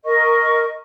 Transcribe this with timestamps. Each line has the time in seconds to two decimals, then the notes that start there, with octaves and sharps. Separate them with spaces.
0.04 A#4 D#5 C#6